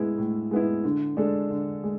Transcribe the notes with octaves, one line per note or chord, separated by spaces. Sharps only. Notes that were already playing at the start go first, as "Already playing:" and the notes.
Already playing: A2 G#3 B3 E4
A2
G#3 B3 E4
D3
G#3 D4 A4
D3
G#3